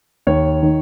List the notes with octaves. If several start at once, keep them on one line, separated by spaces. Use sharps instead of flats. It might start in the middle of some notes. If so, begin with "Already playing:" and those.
D#2 C#5
D#3